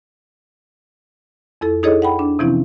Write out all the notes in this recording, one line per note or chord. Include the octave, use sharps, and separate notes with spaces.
F2 E4 A4
D#4 E4 G#4 A4 C#5 D#5
F#5 G5 B5
D4
C3 E3 F3 C4 C#4 E4